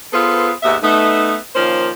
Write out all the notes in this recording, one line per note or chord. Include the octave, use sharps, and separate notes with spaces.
B3 F4 G#4 A4 B4 C5
D#2 G#2 B3 E5
A3 B3 D#4
D#3 F3 A#3 C#4 C5